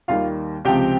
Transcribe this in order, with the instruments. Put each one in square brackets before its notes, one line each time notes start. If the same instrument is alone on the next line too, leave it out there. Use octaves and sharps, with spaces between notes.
[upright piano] D#2 D#3 G3 A#3 F4 F5
C#2 C3 F3 C4 G4 G5